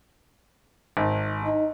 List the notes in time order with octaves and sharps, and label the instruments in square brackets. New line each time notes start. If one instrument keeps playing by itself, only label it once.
[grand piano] G#1
[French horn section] D#4